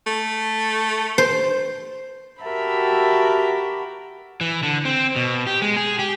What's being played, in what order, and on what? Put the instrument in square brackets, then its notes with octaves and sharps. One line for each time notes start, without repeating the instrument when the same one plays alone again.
[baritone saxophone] A3
[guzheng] C5
[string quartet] F#4 G4 A4 A#4 E5 B5
[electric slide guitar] E3
D3
C4
B2
G4
G#3
G#4
G4